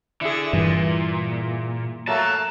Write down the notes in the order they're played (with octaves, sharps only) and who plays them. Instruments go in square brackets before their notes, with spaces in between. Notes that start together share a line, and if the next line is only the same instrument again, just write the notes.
[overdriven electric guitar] D3 [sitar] E4 G#4
[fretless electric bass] G2 E3 [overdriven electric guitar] A#2
[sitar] F#3 A3 A#3 [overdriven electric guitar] A5